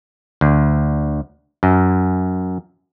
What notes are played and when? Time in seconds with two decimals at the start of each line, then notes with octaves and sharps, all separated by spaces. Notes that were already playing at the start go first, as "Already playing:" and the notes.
0.41 D2
1.63 F#2